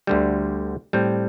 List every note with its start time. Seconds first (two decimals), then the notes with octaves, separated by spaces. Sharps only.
0.07 D2 D3 G3
0.93 A2 G3 C4